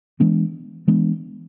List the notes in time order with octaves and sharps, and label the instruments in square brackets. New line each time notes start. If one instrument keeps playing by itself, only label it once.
[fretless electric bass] E3 G#3 B3 D4
E3 G#3 B3 D4